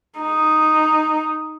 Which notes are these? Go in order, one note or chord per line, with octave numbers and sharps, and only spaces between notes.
D#4